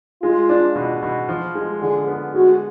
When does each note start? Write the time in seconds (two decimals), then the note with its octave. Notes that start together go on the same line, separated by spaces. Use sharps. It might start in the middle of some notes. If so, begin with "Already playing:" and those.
0.23 G#3 F4
0.49 D4
0.76 B2
1.03 B2
1.29 F3
1.55 G#3
1.81 D3 G#4
2.07 B3
2.34 G#3 F#4